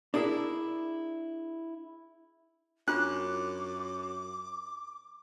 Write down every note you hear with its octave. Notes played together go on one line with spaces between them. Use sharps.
D4 E4 G#4 A#4 E5
F#2 D4 F4 D6 F#6